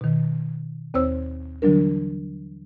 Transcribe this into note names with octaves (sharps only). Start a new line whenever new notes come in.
B2 D#3
D#2 C4 C5 C#5 E6
D3 E3 F#3 G3 D4 A#4